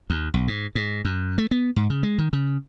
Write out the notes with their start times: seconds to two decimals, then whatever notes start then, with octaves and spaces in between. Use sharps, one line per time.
0.10 D#2
0.34 B1
0.48 G#2
0.75 G#2
1.05 F#2
1.38 A3
1.51 B3
1.76 G#2
1.90 C#3
2.03 G#3
2.18 D#3
2.33 C#3